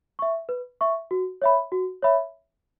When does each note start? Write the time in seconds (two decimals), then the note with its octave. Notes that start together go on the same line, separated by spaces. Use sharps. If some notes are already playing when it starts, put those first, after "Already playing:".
0.19 E5 C#6
0.49 B4
0.81 E5 C#6
1.11 F#4
1.42 C#5 E5 B5
1.72 F#4
2.02 C#5 E5 B5